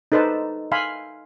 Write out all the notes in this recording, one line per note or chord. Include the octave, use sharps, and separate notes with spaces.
D#4 A4 B4 C5 D5 A5
E5 F5 G#5 B5 C6